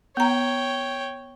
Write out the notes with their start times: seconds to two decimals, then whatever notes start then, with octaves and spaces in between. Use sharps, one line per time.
0.17 B3 C#5 G5 A#5